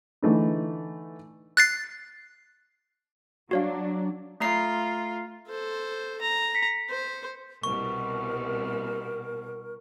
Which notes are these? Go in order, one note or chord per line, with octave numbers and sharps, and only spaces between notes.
D3 E3 A3 D#4
F#6 A6 C7
F#3 D4 F#4 C#5 F5
A3 F4 A#5 C7
A4 C5
A#5
B6 C#7
C5
C2 B2 A#4 C#6